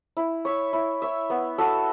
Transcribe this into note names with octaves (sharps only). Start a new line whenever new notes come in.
E4
C#5 E5
E4
C#5 E5
B3
F#4 A4 E5